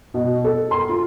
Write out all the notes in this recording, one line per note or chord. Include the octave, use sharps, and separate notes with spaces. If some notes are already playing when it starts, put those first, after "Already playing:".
B2
A4
C6
F4